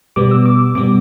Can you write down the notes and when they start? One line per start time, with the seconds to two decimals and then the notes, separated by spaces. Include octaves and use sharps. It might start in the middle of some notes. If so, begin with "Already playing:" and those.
0.16 B2 G3 B3 D6
0.31 E6
0.46 D6
0.75 B2 G3 B3 D6